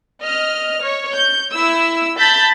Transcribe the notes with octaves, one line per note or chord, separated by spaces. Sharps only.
D#5 F6
C#5
G6
E4 E6
A5 B5 G6 A6 B6